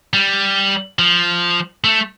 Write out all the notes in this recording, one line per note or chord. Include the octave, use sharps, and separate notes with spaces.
G3
F3
A3